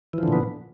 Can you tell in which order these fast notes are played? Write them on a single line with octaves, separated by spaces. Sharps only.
E3 F3 D3 A#2 B3